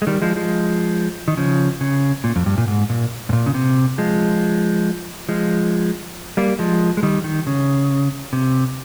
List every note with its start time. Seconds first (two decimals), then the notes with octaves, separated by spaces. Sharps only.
0.02 G#3
0.07 D#3 G3
0.22 F3 G#3
0.36 F3 G#3
1.28 D#3
1.37 C#3 F3
1.81 C#3
2.24 A#2
2.36 F2
2.46 G2
2.58 A#2
2.68 G#2
2.90 A#2
3.29 G#2
3.33 A#2
3.46 C#3
3.54 C3
3.98 F3 G#3
5.29 F3 G#3
6.37 G3 A#3
6.59 F3 G#3
6.97 G#3
7.03 D#3 G3
7.24 D#3
7.47 C#3
8.33 C3